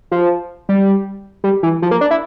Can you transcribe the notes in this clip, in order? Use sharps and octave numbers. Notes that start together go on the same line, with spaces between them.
F3
G3
G3
E3
F3
A#3
D4
E4